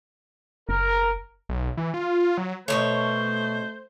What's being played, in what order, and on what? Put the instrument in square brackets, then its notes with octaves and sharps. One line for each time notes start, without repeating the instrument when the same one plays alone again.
[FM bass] F#1 [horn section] A#4
[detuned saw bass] B1
E3
F4
F#3
[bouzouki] B2 F3 C#5 [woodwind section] A3 [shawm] C5